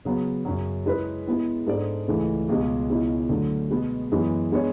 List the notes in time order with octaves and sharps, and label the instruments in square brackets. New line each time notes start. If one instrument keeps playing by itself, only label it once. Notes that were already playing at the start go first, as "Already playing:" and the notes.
[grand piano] C#3 F#3 B3
F#2 C#3 F#3
G#3 C#4 E4 B4
G#3 B3 E4
G#2 G#3 D4 A4 D5
C#2 C#3 E3 A3
C#2 B2 G#3
C#2 B2 G#3 C#4 E4
D3 F#3 A3
B2 G#3 B3
F#2 E3 G#3 B3
G#3 B3 D4 G#4 C#5